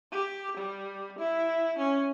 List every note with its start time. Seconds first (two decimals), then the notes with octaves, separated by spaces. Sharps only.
0.12 G4
0.57 G3
1.19 E4
1.78 C#4